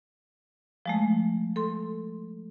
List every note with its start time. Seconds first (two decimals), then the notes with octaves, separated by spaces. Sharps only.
0.86 F3 G#3 A3
1.56 A4 C6